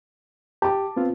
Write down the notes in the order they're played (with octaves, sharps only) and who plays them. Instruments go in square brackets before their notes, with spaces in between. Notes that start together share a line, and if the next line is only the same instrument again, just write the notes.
[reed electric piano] G4 [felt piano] A5 D6
[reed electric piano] B3 C4 F4